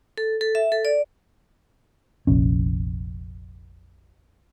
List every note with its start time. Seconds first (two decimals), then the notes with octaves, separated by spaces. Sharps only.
0.18 A4
0.41 A4
0.55 E5
0.72 A4
0.85 D5
2.27 F1 A#1 C#4